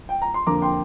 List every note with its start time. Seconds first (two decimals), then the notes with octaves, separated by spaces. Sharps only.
0.09 G5
0.22 A#5
0.34 C6
0.47 F2 D3 A#3 A#5 D6
0.62 G5 C6